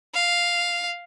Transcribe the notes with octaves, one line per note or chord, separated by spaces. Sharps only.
F5